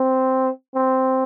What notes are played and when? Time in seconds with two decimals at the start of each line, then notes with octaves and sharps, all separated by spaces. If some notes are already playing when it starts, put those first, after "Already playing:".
Already playing: C4
0.75 C4